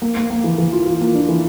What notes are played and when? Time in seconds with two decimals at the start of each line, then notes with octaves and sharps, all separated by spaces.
0.02 A#3
0.16 A#3
0.30 A#3
0.44 E3
0.58 E3
0.72 F4
0.86 F4
1.01 A#3
1.14 D4
1.29 E3